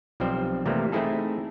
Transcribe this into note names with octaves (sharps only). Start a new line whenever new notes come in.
B1 F3 G3 C4 C5
C3 E3 F3 G3 A3 A#3
A3 C4 D#4 E4 G#4 A4